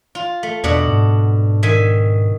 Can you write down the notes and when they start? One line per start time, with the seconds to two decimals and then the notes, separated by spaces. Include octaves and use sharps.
0.15 F4
0.43 A3
0.64 E2 B2 D4 F#5
0.88 G#2
1.63 D#3 E5 G#5